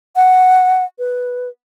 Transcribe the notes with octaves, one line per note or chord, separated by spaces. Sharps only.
F#5
B4